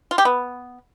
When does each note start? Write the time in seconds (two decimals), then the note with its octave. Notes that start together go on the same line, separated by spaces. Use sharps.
0.11 F4
0.18 G4
0.25 B3